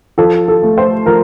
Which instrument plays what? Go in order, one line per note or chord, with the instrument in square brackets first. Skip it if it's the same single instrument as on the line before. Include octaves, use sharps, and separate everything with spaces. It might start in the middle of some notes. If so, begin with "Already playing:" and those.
[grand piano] F3 [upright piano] A4
[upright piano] A4
[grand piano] A3
[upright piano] C5
[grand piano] F3 [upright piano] A#4